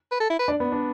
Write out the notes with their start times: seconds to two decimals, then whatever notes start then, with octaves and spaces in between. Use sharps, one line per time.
0.12 B4
0.20 A4
0.30 E4
0.39 B4
0.48 D4 D5
0.60 B3
0.72 D4